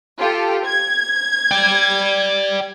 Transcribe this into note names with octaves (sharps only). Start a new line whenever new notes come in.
F4 G4 A4
G#6
D5 G5